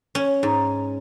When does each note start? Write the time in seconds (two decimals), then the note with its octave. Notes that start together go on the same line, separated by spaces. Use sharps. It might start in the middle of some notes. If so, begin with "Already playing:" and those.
0.15 C#4
0.43 G#2